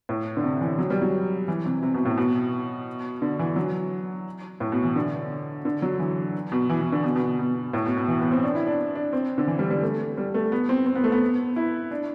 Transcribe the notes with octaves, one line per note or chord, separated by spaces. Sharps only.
A2
D3
C3
E3
F#3
G3
F#3
E3
C3
C3
B2
A2
B2
D3
E3
F#3
A2
B2
E3
D3
D3
F#3
E3
B2
E3
E3
D3
B2
B2
B2
A2
B2
B2
E3
B3
C4
D4
E4
D4
D4
C4
D3
E3
G3
G3
A3
G3
A3
B3
C4
C4
B3
A3
B3
E4
D4